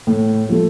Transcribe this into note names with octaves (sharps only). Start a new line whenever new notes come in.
A2
F3 A3